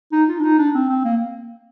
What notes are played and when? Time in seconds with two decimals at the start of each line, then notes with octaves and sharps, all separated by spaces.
0.12 D#4
0.28 F4
0.39 D4
0.43 D#4
0.58 D4
0.74 C4
0.89 C4
1.04 A#3